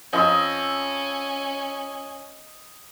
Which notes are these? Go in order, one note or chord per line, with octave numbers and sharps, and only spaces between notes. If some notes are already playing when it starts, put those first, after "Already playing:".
F2 C#4 D#5 E6